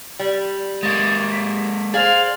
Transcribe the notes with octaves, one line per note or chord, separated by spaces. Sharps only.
G3
G#3 A#3 A6
B6
G#4 C5 D5 F5